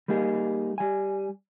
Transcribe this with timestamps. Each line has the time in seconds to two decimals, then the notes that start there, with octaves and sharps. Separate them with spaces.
0.08 G3 A#3 D#4 G#4
0.78 G3 G#5